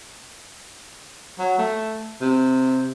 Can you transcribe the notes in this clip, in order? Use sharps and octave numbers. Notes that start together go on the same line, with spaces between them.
F#3
A3
C3